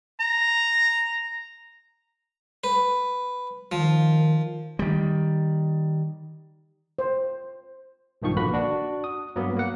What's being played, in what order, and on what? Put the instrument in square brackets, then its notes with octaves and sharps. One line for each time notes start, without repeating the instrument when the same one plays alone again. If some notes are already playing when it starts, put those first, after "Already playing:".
[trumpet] A#5
[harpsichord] B4
[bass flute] D#3 [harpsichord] F3
[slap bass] D#3 G3
[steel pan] C5
[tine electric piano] B1 G2 D#3 F3 C#6
A#1 D3 A#3 F#4 B4 B5
D4 F#4
D#6
G2 F#3 A#3 B3
A#3 F#5